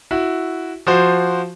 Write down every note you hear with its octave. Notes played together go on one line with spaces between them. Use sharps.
E4 F#4
F3 F#4 C5